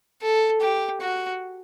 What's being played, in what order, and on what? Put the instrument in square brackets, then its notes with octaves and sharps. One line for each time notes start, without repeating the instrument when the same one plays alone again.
[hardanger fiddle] A4
G4
F#4